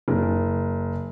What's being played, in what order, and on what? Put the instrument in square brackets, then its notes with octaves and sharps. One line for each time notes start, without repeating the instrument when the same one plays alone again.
[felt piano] F#1